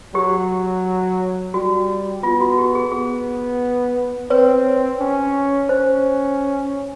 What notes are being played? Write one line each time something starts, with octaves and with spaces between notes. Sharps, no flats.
F#3 G4
G3 F#4
B3 F4
F#4
G4
G#4
B3 G#4
C4 B4 C#5
C#4
C#4 C5